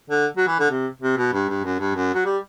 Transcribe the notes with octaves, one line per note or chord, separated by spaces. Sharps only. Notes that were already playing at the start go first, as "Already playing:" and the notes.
D3
F#3
E3
D3
C3
C3
B2
G2
G2
F#2
G2
F#2
F#3
G3